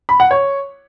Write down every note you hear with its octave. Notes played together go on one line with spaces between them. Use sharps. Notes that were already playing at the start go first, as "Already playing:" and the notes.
B5
F#5
C#5